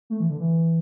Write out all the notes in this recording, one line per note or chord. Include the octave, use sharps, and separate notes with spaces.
A3
E3
D3
E3